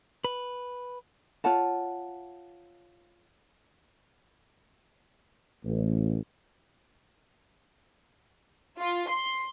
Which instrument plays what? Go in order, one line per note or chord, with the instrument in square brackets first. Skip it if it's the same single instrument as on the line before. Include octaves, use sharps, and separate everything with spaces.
[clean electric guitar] B4
[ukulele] F4 C#5 F#5 A5
[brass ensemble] A1
[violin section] F4
C6